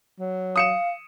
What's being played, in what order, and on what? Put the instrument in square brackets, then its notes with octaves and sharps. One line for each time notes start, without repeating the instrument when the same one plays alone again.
[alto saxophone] F#3
[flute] F5 [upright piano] D#6 C#7 E7